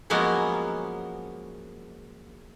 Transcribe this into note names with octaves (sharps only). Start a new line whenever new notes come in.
F3 F#3 G#3 A#3 B3 C#4